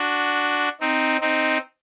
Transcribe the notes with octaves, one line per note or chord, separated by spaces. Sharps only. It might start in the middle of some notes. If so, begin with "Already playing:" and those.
Already playing: D4 F#4
C4 D#4
C4 D#4